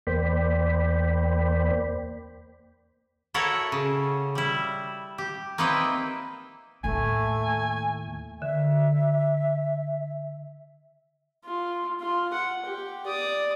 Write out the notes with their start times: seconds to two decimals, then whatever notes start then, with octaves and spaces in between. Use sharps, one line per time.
0.07 E2 A#3 C5 D5 G5 B5
3.34 E4 F#4 A4 A#4 C#5 F#5
3.72 C#3
4.35 G3 E4
5.18 G4
5.58 A#3 C4 D#4 E4 B4 G5
6.84 D#2 A2 A3 G#5
8.42 D3 E5
11.45 F4
12.00 F4
12.33 F#5
12.65 G4
13.06 D5 D#6